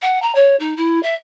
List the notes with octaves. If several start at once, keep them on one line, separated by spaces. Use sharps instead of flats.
F#5
A#5
C#5
D#4
E4
E5